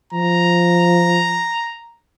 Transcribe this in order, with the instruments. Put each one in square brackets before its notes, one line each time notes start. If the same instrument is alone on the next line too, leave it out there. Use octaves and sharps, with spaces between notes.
[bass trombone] F3 [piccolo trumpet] A#5